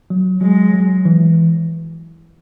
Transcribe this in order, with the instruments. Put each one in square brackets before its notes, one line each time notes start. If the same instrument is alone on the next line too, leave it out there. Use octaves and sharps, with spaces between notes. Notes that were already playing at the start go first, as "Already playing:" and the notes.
[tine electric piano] F#3
[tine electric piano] F#3 [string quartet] G#3
[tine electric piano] F#3
E3